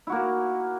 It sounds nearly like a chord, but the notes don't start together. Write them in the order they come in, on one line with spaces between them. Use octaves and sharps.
E4 F#4 A#3